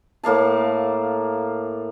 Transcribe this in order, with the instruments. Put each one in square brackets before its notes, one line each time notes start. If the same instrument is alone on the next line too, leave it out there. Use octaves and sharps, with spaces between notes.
[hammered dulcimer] A2 A#3 F5 A5